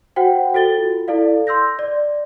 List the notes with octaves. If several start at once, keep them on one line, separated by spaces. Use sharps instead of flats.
F#4 C5 F#5 G5
F#4 A4 A6 G7
F4
E4 A4 D5 F5
C6 E6 G6 A#6
D5